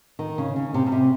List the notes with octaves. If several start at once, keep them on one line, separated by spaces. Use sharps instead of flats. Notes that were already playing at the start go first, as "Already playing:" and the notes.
D#3
C#3
C#3
C3
C#3
C3